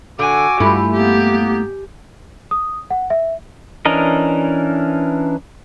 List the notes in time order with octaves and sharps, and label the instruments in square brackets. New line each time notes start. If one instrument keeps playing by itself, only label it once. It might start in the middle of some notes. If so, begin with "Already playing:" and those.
[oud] D3 [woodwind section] F#4 F#5 D6 [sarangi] G#5
[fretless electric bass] G2 [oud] A3 E4 F4 [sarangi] G4
[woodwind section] A#3 B3 [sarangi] G4
[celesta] D#6
F#5
E5
[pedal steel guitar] E3 C#4 D4 A#4 D#5